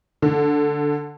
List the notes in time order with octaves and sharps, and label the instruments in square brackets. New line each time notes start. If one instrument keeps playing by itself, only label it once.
[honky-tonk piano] D3